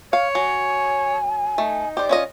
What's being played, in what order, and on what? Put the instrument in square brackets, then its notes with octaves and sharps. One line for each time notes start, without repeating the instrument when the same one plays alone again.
[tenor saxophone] C#5 [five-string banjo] F5
[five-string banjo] F#3 [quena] G#5
[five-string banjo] A3 [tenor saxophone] D#4
[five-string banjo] G4 C5 [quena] D5
[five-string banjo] C#4 F4 D#5